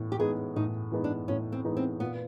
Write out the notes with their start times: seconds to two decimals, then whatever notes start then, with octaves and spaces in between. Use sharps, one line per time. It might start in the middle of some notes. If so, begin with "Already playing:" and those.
Already playing: A2 E3 B3
0.12 G4
0.19 E3 G#3 B3 D#4 G#4
0.56 A2 D#4
0.92 E3 G#3 B3 D#4
1.04 D4
1.28 A2 C#4
1.52 C4
1.64 E3 G#3 B3 D#4
1.77 C4
2.00 A#2 B3